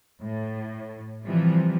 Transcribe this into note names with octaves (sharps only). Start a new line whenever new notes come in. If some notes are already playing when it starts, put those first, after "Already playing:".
A2
C3 E3 F3 G3